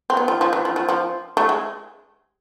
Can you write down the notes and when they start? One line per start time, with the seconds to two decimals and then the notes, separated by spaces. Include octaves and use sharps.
0.10 C4
0.17 B3
0.28 F3
0.41 F3
0.53 E3
0.65 F3
0.76 F3
0.89 F3
1.37 A3
1.49 G#3